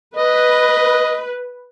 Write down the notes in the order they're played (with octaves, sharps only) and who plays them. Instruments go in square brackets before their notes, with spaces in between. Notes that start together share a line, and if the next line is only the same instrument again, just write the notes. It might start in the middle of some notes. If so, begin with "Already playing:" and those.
[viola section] B4 [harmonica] D#5